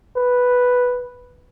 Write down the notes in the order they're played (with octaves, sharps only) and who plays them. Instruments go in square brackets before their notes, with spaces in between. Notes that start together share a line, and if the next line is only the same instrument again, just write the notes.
[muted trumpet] B4